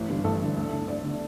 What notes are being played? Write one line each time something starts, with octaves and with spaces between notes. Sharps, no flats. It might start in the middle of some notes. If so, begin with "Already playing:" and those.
Already playing: A1
G2 D3
A1 A4
G2 D3
D2
D3
D2 D5
D3